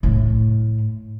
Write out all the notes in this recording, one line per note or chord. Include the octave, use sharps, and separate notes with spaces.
A2